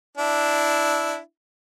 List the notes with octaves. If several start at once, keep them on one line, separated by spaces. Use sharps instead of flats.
D4 E4